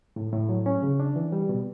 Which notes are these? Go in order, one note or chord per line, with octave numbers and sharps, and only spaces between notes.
A2
A2
F#3
C#4
C#3
D4
E3
G3
B2